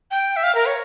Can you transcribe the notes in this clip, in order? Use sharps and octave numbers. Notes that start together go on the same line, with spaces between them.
G5
E5
F5
A#4
C#5